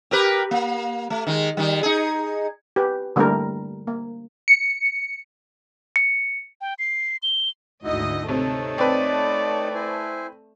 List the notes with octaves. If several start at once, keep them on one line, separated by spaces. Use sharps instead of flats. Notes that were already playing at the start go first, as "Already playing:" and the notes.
G4 A#4 B4
A#3
A3
D#3 G#3
D#3 G3
D#4 G#4
G4 B4
D3 G3 A3 A#3 D4 A#4
A#3
C#7
C#7
G5
C7
G7
G#1 D2 D#4 E4 F#4 D#5
C3 A3 D#4 C#5 A5
C4 B4 D5
E4 C5 G#5